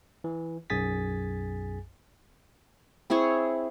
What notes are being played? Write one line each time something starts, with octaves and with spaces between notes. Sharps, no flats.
E3
B1 F#2 G#4 G#5 A6 B6
C4 E4 G#4 C#5